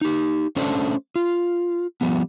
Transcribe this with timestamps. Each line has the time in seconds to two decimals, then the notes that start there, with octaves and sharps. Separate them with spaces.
0.01 D#4 G4
0.56 A3 C#4 D4 A4 C5
1.16 F4
2.01 F3 G3 B3